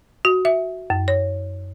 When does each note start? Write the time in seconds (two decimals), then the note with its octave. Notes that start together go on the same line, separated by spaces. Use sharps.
0.25 F#4
0.45 E5
0.90 F#2
1.08 C#5